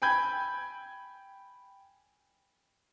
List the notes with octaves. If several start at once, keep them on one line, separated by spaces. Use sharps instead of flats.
G5 G#5 B5 G6 G#6